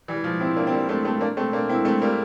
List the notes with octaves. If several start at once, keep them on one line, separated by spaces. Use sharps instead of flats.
E3 G3
F3
C4 E4
A#3 D4
C4
G3 A#3
A3 C4
A3 C4
A#3 D4
A3 C4
A#3 D4
C4 E4
A3 C4
G3 A#3